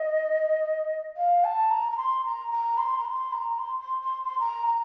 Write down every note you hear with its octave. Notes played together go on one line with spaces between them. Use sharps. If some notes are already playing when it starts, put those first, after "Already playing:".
Already playing: D#5
F5
A5
A#5
A#5
C6
A#5
A#5
C6
A#5
C6
A#5
C6
C6
C6
C6
A#5
A#5